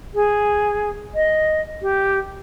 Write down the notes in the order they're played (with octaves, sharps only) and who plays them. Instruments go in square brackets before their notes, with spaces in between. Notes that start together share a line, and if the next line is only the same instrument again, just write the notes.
[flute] G#4
D#5
G4